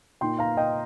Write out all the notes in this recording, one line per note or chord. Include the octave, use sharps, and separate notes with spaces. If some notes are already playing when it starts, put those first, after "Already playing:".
A#2 A#3 D#4 G5 C6
F5 A#5
D#5 G5